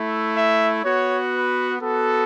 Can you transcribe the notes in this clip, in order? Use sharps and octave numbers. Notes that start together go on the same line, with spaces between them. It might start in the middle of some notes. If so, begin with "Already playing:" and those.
Already playing: A3 E4
E5
B3 F#4 C#5
B4
B3 F#4 A4